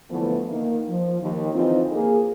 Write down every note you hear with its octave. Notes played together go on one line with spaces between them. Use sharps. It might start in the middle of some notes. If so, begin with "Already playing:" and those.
D2 D3 E3 F3 A3 B3
D#3 A#3
F3
D#2
D3 E3 F3 C4 D#4 F4
A#3 G#4